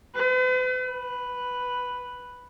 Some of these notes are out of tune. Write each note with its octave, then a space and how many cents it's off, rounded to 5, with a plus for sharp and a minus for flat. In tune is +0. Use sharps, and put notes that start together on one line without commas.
B4 +45
B4 +0